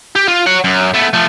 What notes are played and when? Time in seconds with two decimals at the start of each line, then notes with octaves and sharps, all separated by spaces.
0.16 G4
0.28 F4
0.47 C#5 F#5
0.64 F#2
0.94 A3 B3
1.13 F3 A3